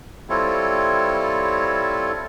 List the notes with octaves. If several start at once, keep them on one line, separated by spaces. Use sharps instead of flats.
G3 C4 E4 F4 A4 C#5